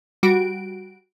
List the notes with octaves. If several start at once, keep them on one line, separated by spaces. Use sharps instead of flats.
G3 F#4 D7